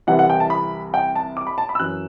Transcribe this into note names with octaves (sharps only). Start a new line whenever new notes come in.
C2 C3 E3 F#5
F#5
G5
A5
B5
G5
A5
D6
B5
A5
B5
E6
F#2 E3 F#6